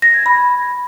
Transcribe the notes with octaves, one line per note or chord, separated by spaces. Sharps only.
A#6
G#6
B5